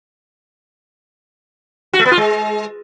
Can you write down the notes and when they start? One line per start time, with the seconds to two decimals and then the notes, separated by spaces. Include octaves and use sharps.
1.93 F#4
1.99 A3
2.05 B3
2.11 F4
2.17 G#3